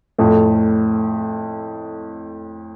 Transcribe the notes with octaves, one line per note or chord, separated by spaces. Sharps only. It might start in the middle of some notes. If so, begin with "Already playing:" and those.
F2 A2